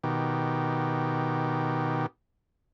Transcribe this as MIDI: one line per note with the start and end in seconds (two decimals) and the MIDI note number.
0.04 2.06 47
0.04 2.06 51
0.04 2.06 67